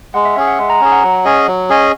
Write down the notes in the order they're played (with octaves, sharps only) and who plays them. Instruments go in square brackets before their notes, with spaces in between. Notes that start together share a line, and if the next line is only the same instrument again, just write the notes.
[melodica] G#3 [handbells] F#5
[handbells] E5
[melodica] C#4 G#4 [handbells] E5
[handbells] F#5
[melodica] G#3
[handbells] A#5
[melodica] C#4 G#4 [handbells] A#5
[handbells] F#5
[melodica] F#3
C#4 G#4 D#5
F#3
C#4 G#4 D#5